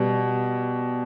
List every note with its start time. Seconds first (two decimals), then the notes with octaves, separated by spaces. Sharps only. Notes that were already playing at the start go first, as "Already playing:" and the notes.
Already playing: B2 G3